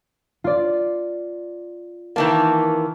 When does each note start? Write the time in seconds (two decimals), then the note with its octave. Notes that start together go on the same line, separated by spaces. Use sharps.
0.44 F4 D5
2.16 D#3 E3 A#3 A5